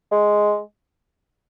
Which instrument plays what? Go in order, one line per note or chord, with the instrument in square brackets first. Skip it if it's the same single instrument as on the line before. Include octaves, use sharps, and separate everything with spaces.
[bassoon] G#3